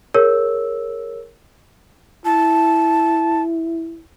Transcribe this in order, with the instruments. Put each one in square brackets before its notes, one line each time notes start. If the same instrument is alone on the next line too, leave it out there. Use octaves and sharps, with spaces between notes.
[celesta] G#4 A#4 C#5 E6
[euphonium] E4 [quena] A5